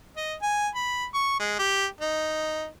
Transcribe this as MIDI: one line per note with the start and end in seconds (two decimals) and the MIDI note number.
0.17 0.34 75
0.42 0.68 80
0.75 1.05 83
1.14 1.35 85
1.40 1.58 56
1.59 1.85 67
2.01 2.67 63